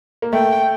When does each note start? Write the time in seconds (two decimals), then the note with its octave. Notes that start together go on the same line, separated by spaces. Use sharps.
0.22 A#3
0.33 A3 G5